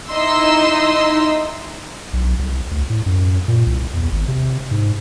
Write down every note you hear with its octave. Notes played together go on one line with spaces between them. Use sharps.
D#4 E4 D#5 C6 E6
B1
C2
D2
A2
F#2
A#2
C2
E2
G#1
C3
G#2